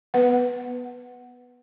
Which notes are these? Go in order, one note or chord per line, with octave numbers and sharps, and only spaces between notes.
B3 B4 F#5